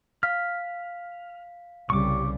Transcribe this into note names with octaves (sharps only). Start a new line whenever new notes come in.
F5 F6 B6
C2 C#3 G3 C#6 D6